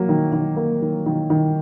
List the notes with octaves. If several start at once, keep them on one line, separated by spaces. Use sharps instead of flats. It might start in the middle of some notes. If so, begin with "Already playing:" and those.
Already playing: F#3 A#3
D#3
D#3
A#3
D#3
D#3
D#3